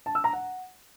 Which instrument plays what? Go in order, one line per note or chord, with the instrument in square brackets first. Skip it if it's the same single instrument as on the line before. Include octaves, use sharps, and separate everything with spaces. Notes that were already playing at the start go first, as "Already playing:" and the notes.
[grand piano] A5
E6
A#5
F#5